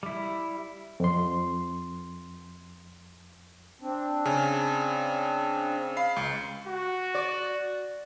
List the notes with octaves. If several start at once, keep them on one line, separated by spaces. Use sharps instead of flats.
G3 E4
F2 C6
C4 D4
C#3 G#5
F5 B5 C7
C#2
F#4
D5